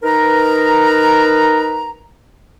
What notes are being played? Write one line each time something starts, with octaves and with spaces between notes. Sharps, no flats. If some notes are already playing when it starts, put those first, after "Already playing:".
D#4 A#4 B4 A#5